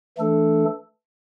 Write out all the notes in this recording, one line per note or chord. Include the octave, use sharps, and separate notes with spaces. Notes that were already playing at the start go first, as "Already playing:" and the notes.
E3 A3 D4 A4